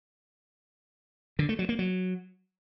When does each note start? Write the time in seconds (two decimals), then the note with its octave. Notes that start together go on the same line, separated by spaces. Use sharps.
1.39 D3
1.49 A3
1.59 F#3
1.69 A#3
1.79 F#3